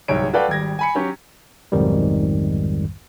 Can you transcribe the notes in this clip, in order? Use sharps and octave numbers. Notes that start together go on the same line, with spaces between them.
D1 C2 G#2 C#5 D7
F#4 A4 B4 D5 F5 G5
G#1 G3 G#6 A#6
G#5 B5 C#7
F#3 C#4 G4
B1 F2 G#2 D#3 G3